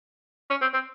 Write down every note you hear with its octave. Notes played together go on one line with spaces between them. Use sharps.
C#4
C4
C4